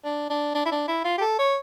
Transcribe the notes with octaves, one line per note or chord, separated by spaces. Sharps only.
D4
D4
D4
E4
D4
E4
F4
G4
A4
C#5